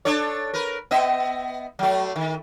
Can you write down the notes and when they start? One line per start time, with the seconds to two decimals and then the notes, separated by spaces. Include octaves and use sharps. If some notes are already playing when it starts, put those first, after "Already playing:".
0.05 D4 A4 C#5
0.54 A#4 B4
0.91 B3 D#5 E5
1.79 F#3 A3
2.16 D#3